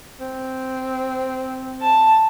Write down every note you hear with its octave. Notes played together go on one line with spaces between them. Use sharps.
C4
A5